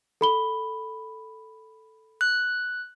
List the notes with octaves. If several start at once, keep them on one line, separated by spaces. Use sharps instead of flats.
A4 B5 G7
F#6